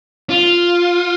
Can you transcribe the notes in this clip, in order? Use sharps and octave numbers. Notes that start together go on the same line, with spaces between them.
F4